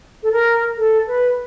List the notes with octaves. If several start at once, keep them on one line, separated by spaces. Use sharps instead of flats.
A4
A#4
A4
B4